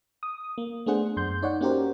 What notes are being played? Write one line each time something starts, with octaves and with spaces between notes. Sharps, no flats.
D#6
A#3
A3 B3 D4 G#4 C5 F#5
F#2 C6 G6
D#4 C#5 D5 F#5
A#3 C#4 F#4 G4 A#4 C5